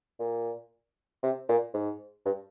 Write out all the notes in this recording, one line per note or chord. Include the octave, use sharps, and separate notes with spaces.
A#2
C3
A#2
G#2
G2